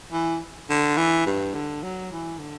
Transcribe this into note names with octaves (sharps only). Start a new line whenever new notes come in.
E3
D3
E3
G2
D3
F#3
E3
D3